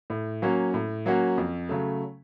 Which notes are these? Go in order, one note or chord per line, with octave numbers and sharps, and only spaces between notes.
A2
F#3 A#3 C#4 F#4
A2
F#3 A#3 C#4 F#4
F2
C#3 F#3 A3